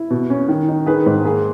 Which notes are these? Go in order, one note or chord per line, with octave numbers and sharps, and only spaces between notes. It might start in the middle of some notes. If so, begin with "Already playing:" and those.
Already playing: E4
B2
C#4
D#3
D#4
D#3 G#4 B4
G#2
A#3 G#4